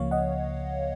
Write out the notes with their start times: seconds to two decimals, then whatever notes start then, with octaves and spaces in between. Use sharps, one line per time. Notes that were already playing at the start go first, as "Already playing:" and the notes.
Already playing: C#2 C#3 F3 A#3 C#5 F5
0.11 D#5 F#5